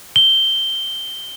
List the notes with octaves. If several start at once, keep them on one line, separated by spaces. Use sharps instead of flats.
G7